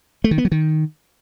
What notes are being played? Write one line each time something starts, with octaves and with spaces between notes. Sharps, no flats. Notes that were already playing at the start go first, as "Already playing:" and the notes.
A3
D#3
B3
F#3
D#3